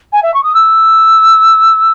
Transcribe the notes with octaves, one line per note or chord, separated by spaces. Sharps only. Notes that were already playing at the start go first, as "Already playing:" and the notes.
G#5
E5
C#6
D#6
E6